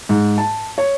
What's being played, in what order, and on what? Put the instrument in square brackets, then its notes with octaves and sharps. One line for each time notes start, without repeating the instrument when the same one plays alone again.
[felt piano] G#2
A5
C#5